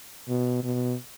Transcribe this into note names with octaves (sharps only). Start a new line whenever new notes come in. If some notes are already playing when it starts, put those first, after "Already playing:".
B2
B2